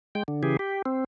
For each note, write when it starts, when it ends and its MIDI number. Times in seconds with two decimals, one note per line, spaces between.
0.15 0.23 56
0.15 0.23 79
0.28 0.43 50
0.43 0.57 49
0.43 0.57 52
0.43 0.57 67
0.43 0.57 68
0.59 0.82 67
0.86 1.04 60